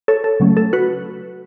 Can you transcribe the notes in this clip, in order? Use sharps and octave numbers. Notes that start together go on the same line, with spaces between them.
A4 C#5
A4
C#3 F#3 A3 C#4
A4
F#4 B4